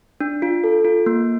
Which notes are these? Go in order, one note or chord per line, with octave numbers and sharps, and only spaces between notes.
D4
F4
A4
F4
A#3